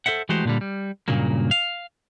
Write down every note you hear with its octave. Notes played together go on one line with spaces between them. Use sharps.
A4 C5 E5 F#5
E3 G#3 A3 F#4 G4 C5
A#2 D3 G3
G3
G2 A#2 C#3 F#3 A#3
F5